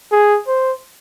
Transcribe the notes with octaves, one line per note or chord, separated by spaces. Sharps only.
G#4
C5